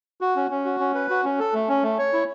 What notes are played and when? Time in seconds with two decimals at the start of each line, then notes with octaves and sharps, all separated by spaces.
0.21 F#4
0.36 C#4
0.50 C#4
0.65 F#4
0.80 C#4
0.95 B4
1.10 F#4
1.24 C#4
1.39 A4
1.54 A3
1.68 C#4
1.83 A3
1.98 C#5
2.13 E4